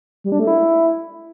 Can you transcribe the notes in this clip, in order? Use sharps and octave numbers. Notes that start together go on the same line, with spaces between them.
G3
D4
A3
E4